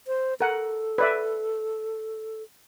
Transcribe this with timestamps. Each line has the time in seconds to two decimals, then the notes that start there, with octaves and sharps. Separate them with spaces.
0.07 C5
0.41 A4 A#4 F#5
0.98 B4 D5 E5